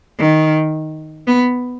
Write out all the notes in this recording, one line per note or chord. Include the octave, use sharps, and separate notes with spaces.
D#3
B3